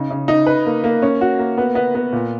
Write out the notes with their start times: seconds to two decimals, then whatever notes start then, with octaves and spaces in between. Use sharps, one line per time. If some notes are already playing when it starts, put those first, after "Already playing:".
Already playing: C#3 D#4
0.11 C#3
0.28 D#4
0.46 B4
0.66 A#3
0.84 A#3
1.02 C#4
1.21 F#4
1.39 A#3
1.58 B3
1.75 B3
1.95 B3
2.13 A#2